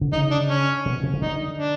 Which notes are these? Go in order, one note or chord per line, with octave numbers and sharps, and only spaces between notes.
D3
C#3 D#4
D4
C#4
B2
C3
C#3
D3 D#4
D4